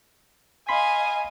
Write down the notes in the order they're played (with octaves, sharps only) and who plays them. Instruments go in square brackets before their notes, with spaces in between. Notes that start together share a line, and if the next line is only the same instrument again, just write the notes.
[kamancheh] D#5 F5 [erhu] G#5 [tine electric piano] B5 C6 B6